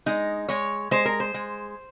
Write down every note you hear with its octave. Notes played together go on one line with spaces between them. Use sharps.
G#3 D#4
G#3 C#5
G#3 C5
A#4
C5
G#3